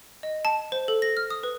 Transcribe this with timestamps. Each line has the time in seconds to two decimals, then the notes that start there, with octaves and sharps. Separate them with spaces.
0.23 D#5
0.45 A5
0.72 C5
0.88 A4
1.02 A#6
1.17 F6
1.30 D#6
1.43 B4